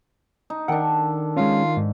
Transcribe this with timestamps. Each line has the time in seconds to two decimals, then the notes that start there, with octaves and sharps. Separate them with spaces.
0.50 D#4
0.68 D#3 D4 A4 F#5 G5
1.37 G#3 C#4 F4
1.77 G#2